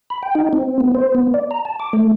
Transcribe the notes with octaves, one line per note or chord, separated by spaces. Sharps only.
B5
G5
D#4
C4
B3
C5
B3
D5
A#5
A5
D6
A3